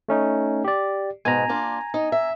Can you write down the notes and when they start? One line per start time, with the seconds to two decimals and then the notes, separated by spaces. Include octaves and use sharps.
0.08 A3 C#4 D#4
0.64 G4 D5
1.25 G#2 B2 G#5 A#5
1.49 A#3 D4 F4
1.94 D#4
2.12 E5